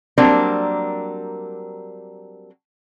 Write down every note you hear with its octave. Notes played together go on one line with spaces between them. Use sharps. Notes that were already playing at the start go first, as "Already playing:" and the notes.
F#3 G3 A#3 C4 D4 A#4